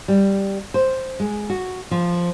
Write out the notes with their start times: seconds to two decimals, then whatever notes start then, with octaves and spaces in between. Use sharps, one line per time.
0.08 G3
0.74 C5
1.20 G#3
1.50 F#4
1.91 F3